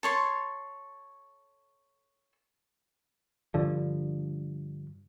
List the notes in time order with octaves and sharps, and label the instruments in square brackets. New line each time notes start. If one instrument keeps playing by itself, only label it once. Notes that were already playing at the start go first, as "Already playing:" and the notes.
[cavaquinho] A4 C#5 C6
[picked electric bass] G2 D3 F3